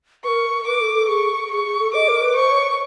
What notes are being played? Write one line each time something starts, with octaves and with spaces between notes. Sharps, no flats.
A#4 B4 C#6
B4 D6
A4
A4
G#4 C#6
G#4 C#6
G#4
A4
D#5 D6
A#4
B4
C5 C#6
C#5